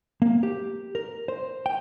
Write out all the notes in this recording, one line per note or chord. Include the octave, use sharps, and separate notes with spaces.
A#3
G4
A#4
C5
G5